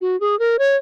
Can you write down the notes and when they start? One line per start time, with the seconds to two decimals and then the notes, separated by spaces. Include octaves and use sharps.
0.01 F#4
0.20 G#4
0.39 A#4
0.59 C#5